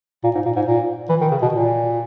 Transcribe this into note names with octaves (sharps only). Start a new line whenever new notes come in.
A#2
G#2
A#2
G#2
A#2
E3
D#3
C#3
B2
A#2